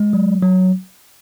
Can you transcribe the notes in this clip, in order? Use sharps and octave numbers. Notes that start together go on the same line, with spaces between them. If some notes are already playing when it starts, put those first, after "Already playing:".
Already playing: G#3
F#3
F#3